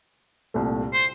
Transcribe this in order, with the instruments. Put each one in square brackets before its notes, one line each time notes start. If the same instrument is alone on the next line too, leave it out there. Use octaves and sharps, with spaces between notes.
[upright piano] C2 A#2 A3
[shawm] C5